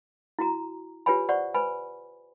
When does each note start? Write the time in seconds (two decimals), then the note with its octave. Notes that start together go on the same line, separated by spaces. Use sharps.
0.39 E4 F#4 A#5
1.06 F4 G4 B4 C#5 G#5 B5
1.29 C5 D5 F#5 C#6
1.54 B4 C5 G#5 B5